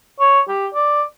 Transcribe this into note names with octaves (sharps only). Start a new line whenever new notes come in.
C#5
G4
D5